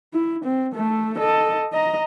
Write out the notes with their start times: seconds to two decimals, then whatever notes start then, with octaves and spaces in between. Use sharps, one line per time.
0.13 E4
0.44 C4
0.74 A3 A4
1.18 A4 D#5
1.73 D#5 A#5